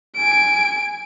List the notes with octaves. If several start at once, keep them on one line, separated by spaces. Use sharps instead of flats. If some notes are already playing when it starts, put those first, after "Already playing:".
G#5 D7